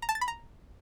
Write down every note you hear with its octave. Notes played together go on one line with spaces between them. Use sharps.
A#5
A5
A6
B5
A#5